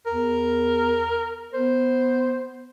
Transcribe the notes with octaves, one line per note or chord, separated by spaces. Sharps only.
E2 A#4
B3 C5